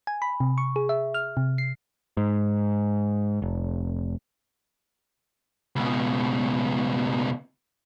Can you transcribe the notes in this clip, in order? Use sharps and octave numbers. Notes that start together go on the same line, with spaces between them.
G#5
B5
C3
C#6
G#4
E5
F6
C3
C7
G#2
F1
C#2 B2